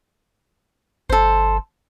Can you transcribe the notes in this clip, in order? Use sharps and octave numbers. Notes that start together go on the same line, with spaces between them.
G1 A4 C5